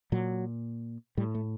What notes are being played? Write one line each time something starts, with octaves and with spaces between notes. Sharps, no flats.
A#2 F#3
A2 G3
A3